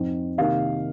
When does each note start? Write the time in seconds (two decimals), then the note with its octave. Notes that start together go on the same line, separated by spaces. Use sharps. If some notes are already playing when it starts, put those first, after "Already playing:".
Already playing: F2 F3 C4 D#4
0.38 C3 D#3 A#3 D#4 F5